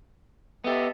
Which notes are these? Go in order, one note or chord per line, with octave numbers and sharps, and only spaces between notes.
B3 G4 A4 D#5 E5